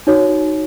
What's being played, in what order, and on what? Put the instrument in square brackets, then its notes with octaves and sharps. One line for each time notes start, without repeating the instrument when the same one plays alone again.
[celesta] D#4 F#4 C#5